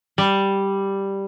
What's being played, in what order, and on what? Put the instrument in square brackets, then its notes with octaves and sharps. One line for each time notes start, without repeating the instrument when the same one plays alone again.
[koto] G3